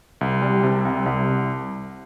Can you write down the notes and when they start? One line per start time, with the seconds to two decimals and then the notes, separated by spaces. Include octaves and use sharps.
0.21 C2
0.42 G3
0.64 C3
0.85 C2
1.06 C2